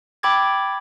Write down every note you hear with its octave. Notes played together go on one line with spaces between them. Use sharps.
G5 B5 D6 E6 G#6 A6